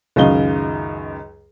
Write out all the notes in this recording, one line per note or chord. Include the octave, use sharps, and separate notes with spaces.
C#2 F#2 D#3 D#5 F5 G7